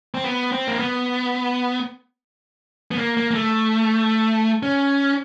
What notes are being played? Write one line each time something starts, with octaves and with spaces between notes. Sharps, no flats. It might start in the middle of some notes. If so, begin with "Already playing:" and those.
C4
B3
C4
A#3
B3
B3
A#3
A#3
A#3
A3
C#4